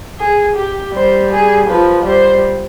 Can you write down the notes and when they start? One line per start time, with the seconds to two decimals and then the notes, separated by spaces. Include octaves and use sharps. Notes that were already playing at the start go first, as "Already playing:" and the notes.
0.19 G#4
0.56 G4
0.94 G3 C5
1.32 G#4
1.68 F3 B4
2.06 G3 C5